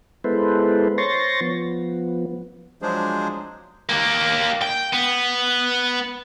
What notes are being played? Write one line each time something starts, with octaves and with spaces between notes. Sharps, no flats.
G#3 B3 E4 A4 B4 C5
C5 C#5 C6 C#6 A6 A#6
F3 B3
F3 F#3 G#3 D4 G#4 C5
A#3 G4
G5
B3